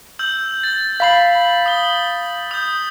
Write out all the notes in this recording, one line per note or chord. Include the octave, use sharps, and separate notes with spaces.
E6 G6 F#7
A6
F5 B5 B6 C7 F#7
D#6 G7
D#6 G6